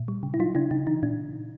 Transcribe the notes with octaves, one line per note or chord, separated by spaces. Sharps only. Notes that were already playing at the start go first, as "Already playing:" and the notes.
Already playing: A#2
G3
C#3
E4
F#3 D#4 F4
C#3 D4 E4
C#3 D#4
E3 D#4
A#2 D4